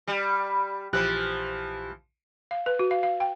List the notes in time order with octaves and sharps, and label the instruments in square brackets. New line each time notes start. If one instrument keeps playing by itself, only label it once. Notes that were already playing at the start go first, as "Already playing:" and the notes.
[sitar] G3
[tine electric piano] A#1 G4 F#6 [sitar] E3 F3
[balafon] F5
B4
F#4
F5
F5
G5